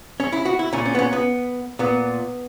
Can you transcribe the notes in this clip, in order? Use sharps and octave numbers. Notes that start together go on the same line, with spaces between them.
C#4
E4
F#4
E4
A#2 C#4
C#4
B3
C#4
B3
A#2 B3